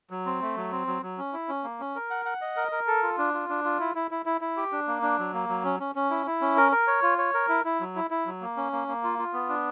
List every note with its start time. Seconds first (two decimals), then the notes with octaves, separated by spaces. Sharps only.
0.11 F#3
0.26 C4
0.42 A3
0.56 F#3
0.72 C4
0.87 F#3
1.03 F#3
1.18 C#4
1.33 E4
1.49 C#4
1.64 A#3
1.80 C#4
1.95 A#4
2.10 F#5
2.25 F#5
2.41 D#5
2.57 A#4
2.72 A#4
2.87 A4
3.03 F4
3.18 D4
3.34 F4
3.49 D4
3.64 F4
3.80 E4
3.95 E4
4.11 E4
4.26 E4
4.41 E4
4.57 G4
4.72 D4
4.87 A#3
5.02 D4
5.19 F#3
5.34 A#3
5.49 F#3
5.64 C#4
5.80 C#4
5.95 C#4
6.11 E4
6.27 E4
6.41 C#4
6.57 A#4
6.72 A#4
6.87 C#5
7.03 F4
7.18 C#5
7.34 A#4
7.49 E4
7.65 E4
7.81 F#3
7.96 E4
8.11 E4
8.26 F#3
8.41 A#3
8.57 C#4
8.72 A#3
8.88 A#3
9.04 F4
9.19 F4
9.33 B3
9.49 D4